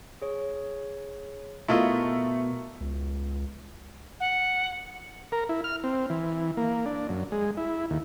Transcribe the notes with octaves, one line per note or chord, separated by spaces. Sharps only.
G#4 C#5
B2 A3 E4 F4 A#4 D#5 A#5 C#6
C#2
F#5
A#4
E4
F6
C4
E3
A#3
D4
F#2
G#3
E4
D#2